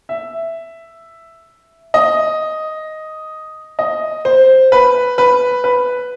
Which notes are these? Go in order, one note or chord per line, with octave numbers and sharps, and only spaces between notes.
E5
D#5
D#5
C5
B4
B4
B4